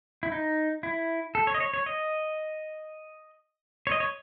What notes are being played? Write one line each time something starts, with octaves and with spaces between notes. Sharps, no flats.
E4
D#4
E4
A4
C#5
D#5
C#5
C#5
D#5
C#5
D#5
C#5